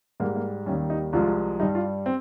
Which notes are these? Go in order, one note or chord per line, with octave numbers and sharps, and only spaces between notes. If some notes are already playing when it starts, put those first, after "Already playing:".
G#2 G3 A#3
A#3
D#2 D#3 G3 C#4
D#4
C2 C3 F3 G#3 F4
G2 G3 D#4
F4
C4